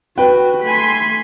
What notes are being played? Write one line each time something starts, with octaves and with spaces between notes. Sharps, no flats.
F#4 B4 G5
A3 G#5 B5 C6